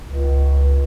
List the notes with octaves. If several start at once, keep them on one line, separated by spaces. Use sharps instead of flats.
C#2